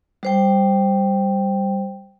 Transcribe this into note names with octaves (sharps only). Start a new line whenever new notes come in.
G3 C5 G5